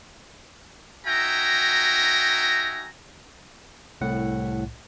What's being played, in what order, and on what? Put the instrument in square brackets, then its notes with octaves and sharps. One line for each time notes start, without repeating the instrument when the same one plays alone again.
[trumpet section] D#4 F#4 E5 G5 G#5 A#5
[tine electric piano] C2 A2 F#5